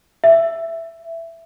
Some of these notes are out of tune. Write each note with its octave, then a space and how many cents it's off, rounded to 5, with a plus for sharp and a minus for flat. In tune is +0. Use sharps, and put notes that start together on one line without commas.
E5 +10